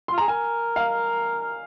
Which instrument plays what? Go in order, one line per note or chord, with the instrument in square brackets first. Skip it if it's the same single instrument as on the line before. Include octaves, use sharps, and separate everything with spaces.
[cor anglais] F4 [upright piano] C6
[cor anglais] G#4 [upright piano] A#5
[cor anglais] A#4 [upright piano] G#5
[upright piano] F5